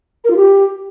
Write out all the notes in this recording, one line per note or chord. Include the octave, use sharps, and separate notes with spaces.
A#4
F4
G4